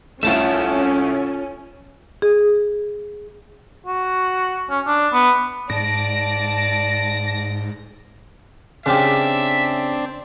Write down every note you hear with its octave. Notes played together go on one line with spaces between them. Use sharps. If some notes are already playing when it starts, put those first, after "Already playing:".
C2 A3 C#4 F4 A4 E5
G#4
F#4
C#4
D4
B3
G#2 D5 A5 A#6 D7
C#3 C4 D4 F4 G4 E5